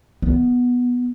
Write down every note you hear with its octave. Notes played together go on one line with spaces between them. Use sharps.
B3